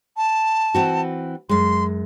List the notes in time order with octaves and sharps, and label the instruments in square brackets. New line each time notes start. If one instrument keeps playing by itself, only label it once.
[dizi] A5
[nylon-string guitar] E3 C4 F#4
[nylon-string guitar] F#2 G#3 [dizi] C6